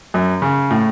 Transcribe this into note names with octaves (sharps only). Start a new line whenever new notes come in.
F#2
C#3
A2